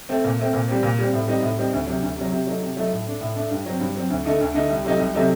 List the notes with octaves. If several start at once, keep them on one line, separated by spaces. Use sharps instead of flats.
A3 C4
A#2
A3 C4
A#2
G3 C4
A#2
G3 C4
A2
G3 C4 D#4
A2
G3 C4 D#4
D2
C3 F#3
D2
C3 F#3
C3
F#3 A3 D#4
C3
F#3 A3 D#4
A2
A3 D4
A2
A3 D4
G2
F#3 C4
G2
F#3 C4
D2
D3 A3 D#4
D2
D3 A3 D#4
C2
C3 F#3 A3 D#4
C2
C3 F#3 A3 D#4